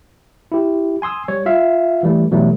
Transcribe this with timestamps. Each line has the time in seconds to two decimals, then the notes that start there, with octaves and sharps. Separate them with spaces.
0.52 E4 G4
1.02 G#5 C6 D#6 E6
1.28 G3 C#5
1.46 F4 E5 F5
2.03 E3 G3 A3
2.31 B2 E3 F#3 G3 A3